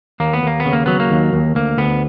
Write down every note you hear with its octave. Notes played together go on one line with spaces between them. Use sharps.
D#2 A#3
B3
D#2 A#3
B3
C#3
A#3
F#3 B3
A#3
D#2
D#2
D2 A#3
D2 B3